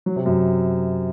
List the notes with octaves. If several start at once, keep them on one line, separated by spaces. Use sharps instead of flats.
F#3
C3
F#2